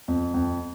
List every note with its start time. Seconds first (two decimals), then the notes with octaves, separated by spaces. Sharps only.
0.08 F2
0.34 F2